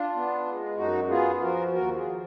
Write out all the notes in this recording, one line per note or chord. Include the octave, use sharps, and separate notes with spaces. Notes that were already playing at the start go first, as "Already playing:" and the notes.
Already playing: D4 F4
B3
G#3
F#2 D#4 F#4
B3 F4 G#4
F3 F#4 A#4
D#2 F#4 A#4
F4 G#4
F3